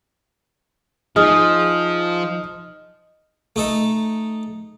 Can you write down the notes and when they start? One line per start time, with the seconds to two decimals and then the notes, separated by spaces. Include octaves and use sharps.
1.16 F3 D#4 G#4 D#6 F6
3.56 A3 D#4 A4